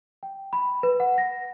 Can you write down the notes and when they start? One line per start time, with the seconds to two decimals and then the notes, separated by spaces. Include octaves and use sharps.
0.23 G5
0.53 B5
0.83 B4
1.00 F#5
1.18 A#6